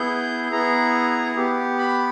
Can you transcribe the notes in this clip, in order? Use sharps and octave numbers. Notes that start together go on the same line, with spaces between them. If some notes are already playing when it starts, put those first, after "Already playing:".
Already playing: B3 E4 G#4 G6
B3 E4 G#4 A#5
B3 G4
B5